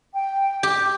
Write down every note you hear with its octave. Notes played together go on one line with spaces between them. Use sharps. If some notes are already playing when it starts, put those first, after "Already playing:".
G5
G4